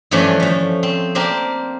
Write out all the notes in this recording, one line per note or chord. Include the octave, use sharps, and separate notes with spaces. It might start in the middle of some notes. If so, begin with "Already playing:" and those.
G2 E3 F3 A3 C#4 D4
F3 A3
C4
A#3 C4 D4 G4 A#4